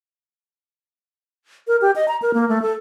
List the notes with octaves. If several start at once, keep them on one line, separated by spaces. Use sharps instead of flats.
A#4
G4
D#5
A#5
A#4
A#3
A3
A4